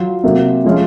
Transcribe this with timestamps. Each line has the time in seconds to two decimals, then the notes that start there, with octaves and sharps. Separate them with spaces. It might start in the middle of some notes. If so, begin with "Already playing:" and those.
Already playing: F#3 F4
0.24 C3 F#3 A#3
0.64 F3 G#3 C#4 F4